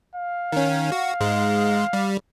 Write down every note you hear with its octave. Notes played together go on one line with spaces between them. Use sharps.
F5
D#3 C#4
F#4
G#2 G#3
G3